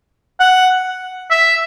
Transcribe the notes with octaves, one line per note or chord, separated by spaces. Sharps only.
F#5
E5